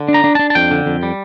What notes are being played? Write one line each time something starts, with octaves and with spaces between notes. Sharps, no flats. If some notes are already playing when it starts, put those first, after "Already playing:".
Already playing: D3
D4
A#5
D4
D4 A5
A5
F2 G5
D3
F2
G3